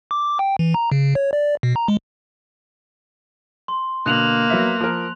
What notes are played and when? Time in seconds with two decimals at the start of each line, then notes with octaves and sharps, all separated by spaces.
0.11 D6
0.39 G5
0.59 E3
0.74 A#5
0.92 C#3
1.15 C#5
1.33 D5
1.63 B2
1.76 A#5
1.88 G#3
3.68 C6
4.06 B2 D3 A#3 F#6 F7 F#7
4.50 F#3 B3 E5
4.80 F3 A#4